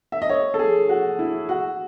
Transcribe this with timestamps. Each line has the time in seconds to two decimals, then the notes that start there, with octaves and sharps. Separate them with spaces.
0.12 E5
0.22 D#5
0.29 C#5
0.54 A4
0.59 G#4
0.89 F#4
1.19 E4
1.49 F#4